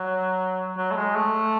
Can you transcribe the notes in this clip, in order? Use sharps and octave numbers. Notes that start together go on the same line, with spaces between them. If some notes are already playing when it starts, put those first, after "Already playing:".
Already playing: F#3
F#3
A3
G#3
A3